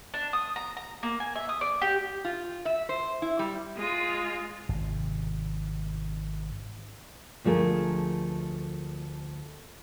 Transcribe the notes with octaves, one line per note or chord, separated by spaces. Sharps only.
D4
D#6
A#5
A#5
A#3
G#5
E5
D#6
D5
G4
F4
E5
C5
E4
G3
G#3 F4
G#1 C3
D2 F3 A3 G#4 A#4